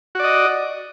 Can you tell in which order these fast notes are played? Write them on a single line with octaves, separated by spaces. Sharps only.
F#4 D5 D#5